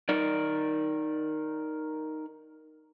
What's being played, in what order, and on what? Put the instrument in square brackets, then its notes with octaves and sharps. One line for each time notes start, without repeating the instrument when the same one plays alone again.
[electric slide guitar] D#4 A#4 D5